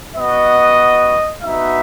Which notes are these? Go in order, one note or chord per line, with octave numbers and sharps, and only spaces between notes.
B3 F#4 D#5
B3 D#4 F#4 E5